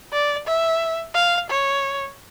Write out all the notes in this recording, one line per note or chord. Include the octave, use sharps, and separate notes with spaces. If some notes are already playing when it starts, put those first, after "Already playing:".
D5
E5
F5
C#5